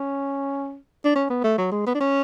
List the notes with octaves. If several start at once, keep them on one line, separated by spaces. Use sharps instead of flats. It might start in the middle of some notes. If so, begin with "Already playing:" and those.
Already playing: C#4
D4
C#4
B3
A3
F#3
G#3
B3
D4
C#4